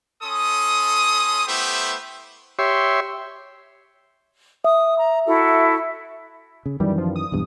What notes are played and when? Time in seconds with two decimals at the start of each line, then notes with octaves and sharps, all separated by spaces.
0.23 C#4 A4 C6 D#6
1.47 A3 B3 E4 G4 C5 E5
2.59 G4 C#5 E5 C6
4.64 E5 D#6
4.99 A#5
5.26 E4 F#4 A4
6.66 C#3
6.80 F#2 D#3 E3 G3
6.98 F3
7.16 D#6
7.32 B1 E2 G2